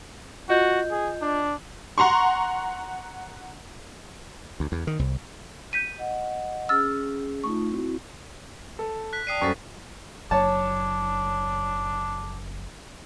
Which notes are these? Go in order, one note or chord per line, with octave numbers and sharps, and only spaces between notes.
F4 F#4 D#5 G6
G#4
D4
F#5 A#5 C6 C#6
D2
E2
D#3
C2
G6 B6 D#7
D#5 F#5
C#4 G#4 E6 F6 A6
A3 D#4 F4 C#6
C4 E4 F#4
A4
F#6 B6
D5 G5 A5 D#6 C7 D#7
F#2 G3 A4 C5 C#6
F#1 F#3 D4 C#5 A5